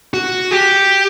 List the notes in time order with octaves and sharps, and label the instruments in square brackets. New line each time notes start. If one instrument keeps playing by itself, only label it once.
[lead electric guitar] F#4
G4